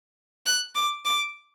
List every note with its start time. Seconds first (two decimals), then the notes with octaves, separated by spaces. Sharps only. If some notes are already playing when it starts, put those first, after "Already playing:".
0.46 F#6
0.75 D6
1.05 D6